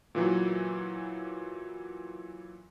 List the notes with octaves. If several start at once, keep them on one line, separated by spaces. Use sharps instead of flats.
A#2 E3 F#3